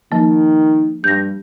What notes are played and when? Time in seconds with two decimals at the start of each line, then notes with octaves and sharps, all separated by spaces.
0.12 D#3 F3 A#3
1.04 G2 G6 A#6